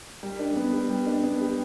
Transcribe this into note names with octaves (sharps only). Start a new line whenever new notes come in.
G3
D4
B3
G4
G3
D4
B3
G4